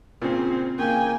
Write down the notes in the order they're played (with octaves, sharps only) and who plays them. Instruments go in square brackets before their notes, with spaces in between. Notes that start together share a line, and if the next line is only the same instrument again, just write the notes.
[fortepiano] A#2 C#3 [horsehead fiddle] C4
[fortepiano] C#3 [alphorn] A#3 [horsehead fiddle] G5 G#5